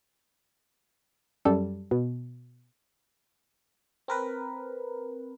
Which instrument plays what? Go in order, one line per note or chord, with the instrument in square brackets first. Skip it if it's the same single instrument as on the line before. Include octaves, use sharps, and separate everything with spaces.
[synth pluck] F#2 G3 A4
B2
[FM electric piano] C4 A#4 B4